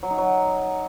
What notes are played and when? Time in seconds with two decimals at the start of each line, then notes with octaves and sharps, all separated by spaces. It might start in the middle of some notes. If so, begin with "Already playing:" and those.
0.03 F#3
0.10 D#4
0.18 F#3